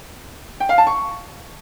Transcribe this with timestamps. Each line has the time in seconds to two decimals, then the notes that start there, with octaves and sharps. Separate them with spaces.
0.60 G5
0.69 F5
0.78 A5
0.87 C#6